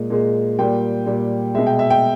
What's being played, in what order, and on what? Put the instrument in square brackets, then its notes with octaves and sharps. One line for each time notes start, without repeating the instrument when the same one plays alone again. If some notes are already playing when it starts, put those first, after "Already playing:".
Already playing: [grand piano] A#2 G#3
A#2 G#3
A#2 G3 G5
A#2 G3
B2 G#3 E5
G5
E5
G5